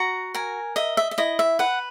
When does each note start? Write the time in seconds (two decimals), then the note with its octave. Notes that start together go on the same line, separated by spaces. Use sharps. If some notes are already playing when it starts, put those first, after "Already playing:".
Already playing: F#4 A#5
0.35 A#4 G#5
0.76 D#5 E5
0.97 E5
1.11 E5
1.18 E4 D#5
1.39 E5
1.59 B4 F#5